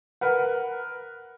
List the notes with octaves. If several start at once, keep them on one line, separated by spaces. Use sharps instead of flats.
A#4 B4 F#5